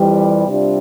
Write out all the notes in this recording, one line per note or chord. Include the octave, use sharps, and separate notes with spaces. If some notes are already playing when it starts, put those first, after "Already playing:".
Already playing: F2 E3 G3
C3 G3 D4 F4